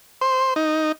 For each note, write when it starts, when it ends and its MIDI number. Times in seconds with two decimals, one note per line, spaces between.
0.21 0.54 72
0.56 0.92 63